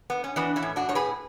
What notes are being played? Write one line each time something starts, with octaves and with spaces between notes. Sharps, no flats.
B3
C#4
E3 B3 D4
C#4 E4
A2
D4 F#4
A2 C#5
G#4 B4